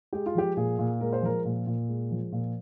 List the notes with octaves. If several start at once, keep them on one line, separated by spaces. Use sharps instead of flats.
G#3 G4
F4
F3 G4
A#2 G#4
A#2
G#3 A#4
C5
F3 A#4
A#2
A#2
G#3
F3
A#2